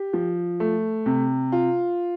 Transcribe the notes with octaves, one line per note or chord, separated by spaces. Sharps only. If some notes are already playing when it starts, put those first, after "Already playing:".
Already playing: G4
F3
A3
C3
F4